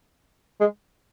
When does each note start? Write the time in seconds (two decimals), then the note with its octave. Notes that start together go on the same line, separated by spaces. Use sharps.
0.60 G#3